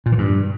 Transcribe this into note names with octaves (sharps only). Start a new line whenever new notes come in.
A#2
E3
G2